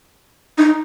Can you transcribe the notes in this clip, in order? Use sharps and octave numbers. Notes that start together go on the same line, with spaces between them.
D#4